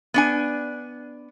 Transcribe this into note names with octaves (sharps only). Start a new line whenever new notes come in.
B3 D4 G#5